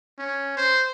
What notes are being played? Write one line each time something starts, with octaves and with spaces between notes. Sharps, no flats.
C#4
C5